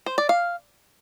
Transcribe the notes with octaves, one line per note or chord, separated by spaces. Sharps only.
C5
D5
F5